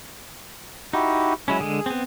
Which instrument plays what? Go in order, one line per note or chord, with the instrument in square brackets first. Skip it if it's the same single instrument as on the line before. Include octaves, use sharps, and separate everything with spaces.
[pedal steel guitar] D#4 [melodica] E4 F#4 G4
[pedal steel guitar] F#3 G#3 C#4 [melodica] E4
[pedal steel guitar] D3 G#3 [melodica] G#4
[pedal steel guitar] B3 C4